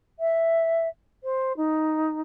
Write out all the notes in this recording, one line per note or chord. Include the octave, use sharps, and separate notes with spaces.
E5
C5
D#4